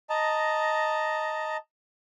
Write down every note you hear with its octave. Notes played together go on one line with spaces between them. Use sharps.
D#5 A5 A#5